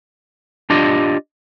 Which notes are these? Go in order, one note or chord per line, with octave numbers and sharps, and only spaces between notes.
D4 F4 G4 D5 D#5